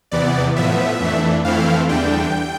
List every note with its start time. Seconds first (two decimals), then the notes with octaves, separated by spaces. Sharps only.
0.12 E2 C3 E3 B3 D5
0.56 A2 F3 B3 E5
1.01 F2 E3 A3 D4
1.44 F2 E3 A3 C4 E4 F5
1.89 E2 D3 G3 D4 G5